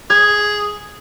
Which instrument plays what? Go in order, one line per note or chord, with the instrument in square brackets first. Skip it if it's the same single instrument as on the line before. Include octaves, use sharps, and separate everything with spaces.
[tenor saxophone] G#4 [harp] G#6